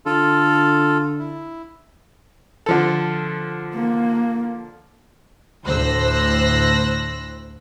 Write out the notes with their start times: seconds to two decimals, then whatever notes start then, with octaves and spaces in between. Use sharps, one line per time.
0.06 D3 F4 A4
1.19 E4
2.66 D3 F3 A4
3.75 A#3
5.66 D2 A2 C5 E6 F#6 A#6